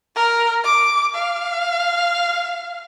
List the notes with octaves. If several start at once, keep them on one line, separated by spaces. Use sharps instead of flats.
A#4
D6
F5